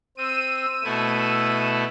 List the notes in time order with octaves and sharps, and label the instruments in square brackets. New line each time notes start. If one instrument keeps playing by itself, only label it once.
[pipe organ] C4 [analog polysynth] E6 D#7
[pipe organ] B2 A3 E4